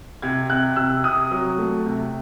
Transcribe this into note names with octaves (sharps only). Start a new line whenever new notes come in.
C3 G#6
C3 F#6
C3 E6
C3 D#6
F#3
A3
C3